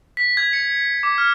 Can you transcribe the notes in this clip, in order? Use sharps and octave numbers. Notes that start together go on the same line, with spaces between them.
B6
G#6
C#7
D6
F6